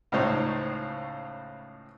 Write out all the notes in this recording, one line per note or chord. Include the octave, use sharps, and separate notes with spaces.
C#2 A2 C#3 D#4 C5 C#5